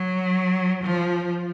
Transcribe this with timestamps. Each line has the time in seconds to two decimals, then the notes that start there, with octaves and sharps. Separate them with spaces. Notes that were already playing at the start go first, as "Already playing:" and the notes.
Already playing: F#3
0.83 F3